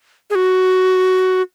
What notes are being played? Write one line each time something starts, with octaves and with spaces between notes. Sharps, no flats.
G#4
F#4